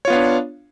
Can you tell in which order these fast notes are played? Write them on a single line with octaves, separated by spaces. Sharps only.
C#5 F4 B3 F5 D4